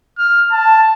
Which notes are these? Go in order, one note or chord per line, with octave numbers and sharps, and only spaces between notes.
F6
A5